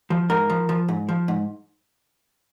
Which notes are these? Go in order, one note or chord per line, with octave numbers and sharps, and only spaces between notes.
F3
G#2 A#4
F3
F3
G#2
F3
G#2